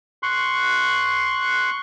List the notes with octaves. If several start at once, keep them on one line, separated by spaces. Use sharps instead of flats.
C6 C#6 F#6